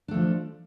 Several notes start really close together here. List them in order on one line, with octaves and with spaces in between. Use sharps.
D4 A3 F3